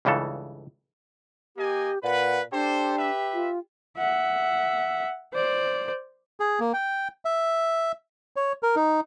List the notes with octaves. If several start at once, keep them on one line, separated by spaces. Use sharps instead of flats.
C#2 G2 C#3 E3 A4
A#3 G4 D#5 G#5
A#2 B4 F#5
D4 G4 A4 C5
B4 E5
F4
E5 F#5
C5 D5
G#4
A#3
G5
E5
C#5
A#4
D#4